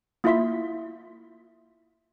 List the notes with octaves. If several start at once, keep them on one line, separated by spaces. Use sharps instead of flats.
A#3 E4 F4 E5 C6 B6